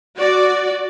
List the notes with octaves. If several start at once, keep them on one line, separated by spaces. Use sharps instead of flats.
F#4 D5